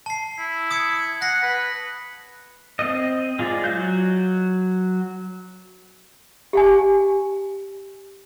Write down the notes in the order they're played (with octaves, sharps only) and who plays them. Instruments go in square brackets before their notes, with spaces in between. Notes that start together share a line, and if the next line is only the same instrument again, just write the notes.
[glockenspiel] A5 C7
[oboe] E4
[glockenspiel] D#6 G#6 C#7
[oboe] F#5 [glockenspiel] F#6 A#6 C7
[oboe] B4
[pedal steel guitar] C4 D#5
G#3 F4 D5
F#3 F#4 G6
[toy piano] G4 F#5 G#5